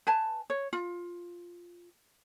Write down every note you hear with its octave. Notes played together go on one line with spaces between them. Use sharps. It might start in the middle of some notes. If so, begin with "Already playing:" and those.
B4 G#5 A5
C#5
F4